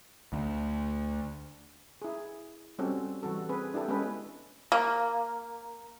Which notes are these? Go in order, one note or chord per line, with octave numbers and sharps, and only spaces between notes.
D2
E4 G#4
G3 C4 C#4 F#4 A4
E3 G3 F#4 A4
C4 G#4 B4
D4 E4 G4 A4
G#3 B3 C#4 G#4 A4 B4
A#3